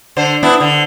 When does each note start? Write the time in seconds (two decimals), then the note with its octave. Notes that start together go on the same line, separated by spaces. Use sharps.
0.17 D3 C5
0.43 B3 D4 E4
0.60 D3